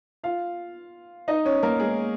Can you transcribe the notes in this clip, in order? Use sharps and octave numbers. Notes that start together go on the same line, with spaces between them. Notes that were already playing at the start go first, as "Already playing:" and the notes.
F4 F5
D#4 D#5
C#4 C#5
A#3 A#4
G#3 G#4